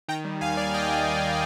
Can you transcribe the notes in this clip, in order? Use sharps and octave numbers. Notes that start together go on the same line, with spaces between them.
D#3 G5 A#5
G3
D#2 F5 G#5
D#3 D5 F5
G3 D#5 G5
D#3
G3